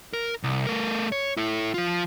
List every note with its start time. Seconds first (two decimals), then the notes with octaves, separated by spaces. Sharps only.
0.13 A#4
0.43 C2
0.67 A3 A#4
1.12 C#5
1.37 E4 A4
1.74 F3 F4